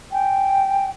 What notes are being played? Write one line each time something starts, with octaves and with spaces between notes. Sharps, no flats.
G5 G#5